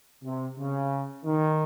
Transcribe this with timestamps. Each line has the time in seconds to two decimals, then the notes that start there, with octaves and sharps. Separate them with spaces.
0.23 C3
0.57 C#3
1.25 D#3